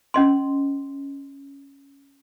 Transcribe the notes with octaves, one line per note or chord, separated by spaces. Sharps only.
C#4 D#5 C6